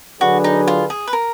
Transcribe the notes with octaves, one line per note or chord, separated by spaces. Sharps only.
D3 F#3 D4 F#4 G#4 B4
D#4
F4
G#4
B4
A#4